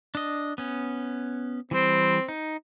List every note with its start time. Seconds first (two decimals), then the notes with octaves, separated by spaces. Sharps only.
0.15 D4 D#5
0.58 B3 C#4
1.71 E3 G3 C4 C5
2.28 D#4